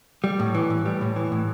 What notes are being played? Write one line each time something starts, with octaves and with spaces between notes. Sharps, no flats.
G3
A2
E3
A2
G3
A2
E3
A2